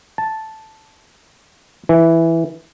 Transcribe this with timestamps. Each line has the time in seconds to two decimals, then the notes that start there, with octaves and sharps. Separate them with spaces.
0.18 A5
1.89 E3